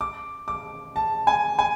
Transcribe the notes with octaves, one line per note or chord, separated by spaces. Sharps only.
D6
D6
A5
G#5
G#5